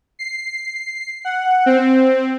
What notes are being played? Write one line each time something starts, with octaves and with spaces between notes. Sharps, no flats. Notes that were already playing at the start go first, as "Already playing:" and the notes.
C7
F#5
C4